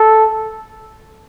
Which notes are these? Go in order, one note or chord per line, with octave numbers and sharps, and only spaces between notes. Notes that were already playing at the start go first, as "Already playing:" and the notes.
Already playing: A4